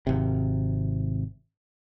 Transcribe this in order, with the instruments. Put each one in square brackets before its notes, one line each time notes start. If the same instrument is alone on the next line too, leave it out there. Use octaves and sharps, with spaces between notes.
[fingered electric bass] G#1 C3